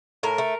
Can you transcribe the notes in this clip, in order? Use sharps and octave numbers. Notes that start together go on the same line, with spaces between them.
A2 A#4 A#5
A3